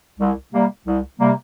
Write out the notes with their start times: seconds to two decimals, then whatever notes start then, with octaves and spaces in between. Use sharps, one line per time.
0.19 C2
0.52 C3 G3 A#3
0.87 C2
1.19 C3 G3 A#3